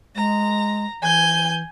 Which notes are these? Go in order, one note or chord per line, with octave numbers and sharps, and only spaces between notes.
G#3 A#5
E3 G#5 G6